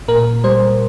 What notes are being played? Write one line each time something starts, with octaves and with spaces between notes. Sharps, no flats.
A#2 A#4
G3 C5